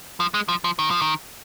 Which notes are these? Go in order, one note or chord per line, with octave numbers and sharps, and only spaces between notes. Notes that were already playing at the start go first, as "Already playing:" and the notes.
F3
G#3
F3
F3
D#3
F3
D#3